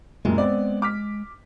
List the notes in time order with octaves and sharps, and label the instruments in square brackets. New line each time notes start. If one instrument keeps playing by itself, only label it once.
[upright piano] F#1 F#2 A#2 [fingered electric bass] G#3
[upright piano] B3 C4 D5
D6 F6 B6